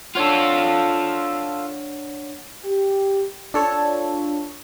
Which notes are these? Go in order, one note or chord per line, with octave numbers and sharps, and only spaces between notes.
D4 F4 A4 C#5 F#5
G4
D4 F4 A4 C#5